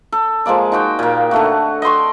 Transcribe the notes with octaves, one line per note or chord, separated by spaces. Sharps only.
A4
F3 G#3 A#3 D5
D#4 F#4 G5
A#2 A#3
D3 A3 F#4
D#5 G5 C6 C#6